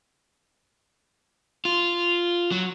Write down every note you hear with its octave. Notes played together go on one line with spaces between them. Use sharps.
F4
F#3